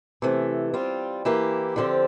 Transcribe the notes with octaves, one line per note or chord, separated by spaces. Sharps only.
C3 E3 A3
G3 C4 F4
E3 A#3 E4 G4
D3 F3 C4 G4